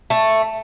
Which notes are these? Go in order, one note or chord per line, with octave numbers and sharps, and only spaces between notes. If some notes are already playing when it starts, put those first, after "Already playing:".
A3